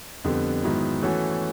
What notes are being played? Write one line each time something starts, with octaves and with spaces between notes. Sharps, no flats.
F2 D3 G3 B3
G#2 D#3 F#3 B3 E4
E3 A3 C#4 F#4 A4